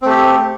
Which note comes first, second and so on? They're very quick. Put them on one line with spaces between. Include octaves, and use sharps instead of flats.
C4 A3 G4